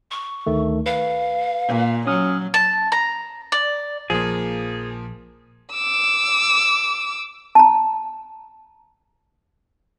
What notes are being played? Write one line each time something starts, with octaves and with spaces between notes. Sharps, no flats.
C#6
D2 D#3 A3
B4 F5
A#2
F#3 C#4 D#6 F6
A5
A#5
D5
A#1 F3 A#3 G#4
D6 E6
A5 A#5